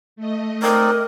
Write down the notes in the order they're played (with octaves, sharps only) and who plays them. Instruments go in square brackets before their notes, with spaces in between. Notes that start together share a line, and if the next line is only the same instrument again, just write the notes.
[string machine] A3 D#5
[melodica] C4 D#4 D5 [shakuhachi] A#4